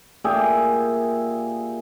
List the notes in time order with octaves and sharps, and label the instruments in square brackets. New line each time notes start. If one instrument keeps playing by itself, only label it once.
[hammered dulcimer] A#2 G4 G#4 E5